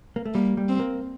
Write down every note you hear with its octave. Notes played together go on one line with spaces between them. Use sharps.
A#3
A3
G3 A#3
G3
C4
A#3